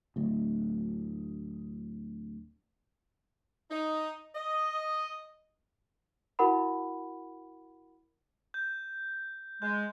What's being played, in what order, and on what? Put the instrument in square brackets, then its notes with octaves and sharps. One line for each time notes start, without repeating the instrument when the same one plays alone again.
[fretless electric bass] D1 D2
[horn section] D#4
D#5
[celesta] E4 F#4 A#4 F#5 B5
[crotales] G6
[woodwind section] G#3 [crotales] G6